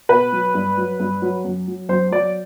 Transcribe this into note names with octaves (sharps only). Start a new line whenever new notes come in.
B2 B4
F#3
G2
F#3
G2
F#3
F#2
F#3
F#2 C5
F#3 D5